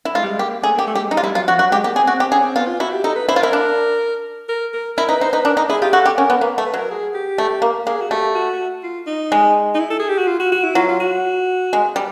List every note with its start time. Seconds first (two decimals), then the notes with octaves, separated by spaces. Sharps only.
0.05 E4
0.15 G#3 F4
0.23 G3
0.31 G#3
0.39 A#3 G4
0.63 A3 G#4
0.75 A#3
0.79 G4
0.87 A3
0.94 G3 G4
0.99 G#3
1.11 G3 D#4
1.17 F4
1.23 G3 E4
1.35 F#3 F4
1.48 F3 F#4
1.59 F#3 F#4
1.72 G#3 G4
1.84 A#3 G4
1.96 C4 G#4
2.07 C4 F#4
2.20 C4 G4
2.32 C#4 G#4
2.44 C4
2.56 B3 F4
2.68 F4
2.80 E4 F#4
2.92 G4
3.04 D#4 A4
3.16 B4
3.28 E4 C5
3.36 F4
3.40 E4 A#4
3.53 D4
4.49 A#4
4.74 A#4
4.97 E4 A#4
5.09 D#4 B4
5.21 D#4 C5
5.33 D#4 B4
5.45 D4 A#4
5.57 D#4
5.69 E4 G#4
5.82 F4 G4
5.93 F#4 A4
6.05 G4
6.18 C#4 A#4
6.30 B3
6.41 A#3 B4
6.58 A3
6.66 B4
6.74 F#3 A#4
6.91 G#4
7.14 G4
7.38 A3
7.62 A#3
7.87 A#3 G#4
8.01 F#4
8.10 A3 G4
8.35 F#4
8.83 F4
9.07 D#4
9.32 G#3
9.75 D#4
9.79 E4
9.90 A4
10.00 G#4
10.09 G4
10.18 F#4
10.27 F4
10.40 F#4
10.52 F#4
10.64 E4
10.75 F#3 F4
10.88 F4
11.00 F#4
11.73 G#3
11.96 G3